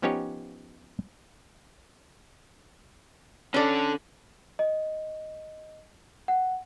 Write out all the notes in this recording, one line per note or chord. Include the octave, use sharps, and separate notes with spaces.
F3 B3 C#4 D#4 G4 C#5
D3 C#4 A4 D5
D#5
F#5